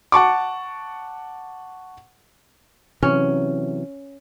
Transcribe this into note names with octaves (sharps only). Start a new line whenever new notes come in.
F#5 A5 C#6 D6
C3 E3 F#3 C#4